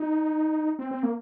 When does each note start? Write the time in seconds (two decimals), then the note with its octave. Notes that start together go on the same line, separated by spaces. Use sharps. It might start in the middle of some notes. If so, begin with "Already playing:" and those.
Already playing: D#4
0.79 C4
0.91 C4
1.03 A#3